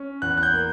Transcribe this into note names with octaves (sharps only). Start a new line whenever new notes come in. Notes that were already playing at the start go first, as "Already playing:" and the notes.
Already playing: C#4
E2 F#6
F#6
G6
A#3